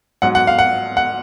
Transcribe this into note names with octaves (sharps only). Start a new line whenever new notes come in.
G#2 F#3 F#5
F#5
F5
F#5
F#5